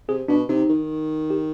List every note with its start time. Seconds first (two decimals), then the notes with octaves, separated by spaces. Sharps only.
0.09 C3 G#4
0.28 B2 D4
0.49 C3 D#4
0.70 D#3
1.30 G4